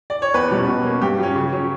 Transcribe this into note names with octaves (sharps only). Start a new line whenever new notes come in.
D5
C#5
E2 B4
B2 G3 C#4
B2
A#3 C#4
G2 G4
F#3 C#4
C#3
F#3 C#4